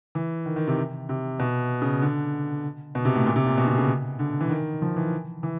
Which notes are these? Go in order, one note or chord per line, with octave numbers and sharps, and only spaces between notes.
E3
D#3
D#3
C3
C3
B2
C#3
D3
B2
C3
A2
A#2
C3
A#2
B2
C3
C#3
D3
E3
D#3
F3
E3
E3